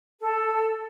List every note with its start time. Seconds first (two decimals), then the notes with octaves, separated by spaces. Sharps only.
0.20 A4